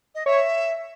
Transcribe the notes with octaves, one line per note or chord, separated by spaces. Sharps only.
D#5
C#5 E5